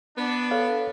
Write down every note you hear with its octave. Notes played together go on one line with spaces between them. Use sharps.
B3 D4
A4 C#5 F5